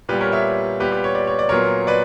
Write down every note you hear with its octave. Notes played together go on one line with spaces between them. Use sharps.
A#2 G3 B3 G4 B4
A#4 C#5
C#5 E5
A#2 G3 B3 G4 B4
G4
C#5
D5
C#5
D5
A#2 F#3 B3 A#4 C#5
B4 D5